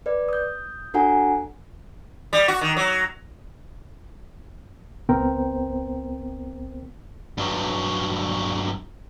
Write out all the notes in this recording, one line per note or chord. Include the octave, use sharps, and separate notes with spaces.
B4 D5
D#6 G6
D4 F#4 A4 F#5 G#5 A#5
G3
F#4
D#3
F#3
C#2 B3 C4 A#4 C5 G5
G2 F#3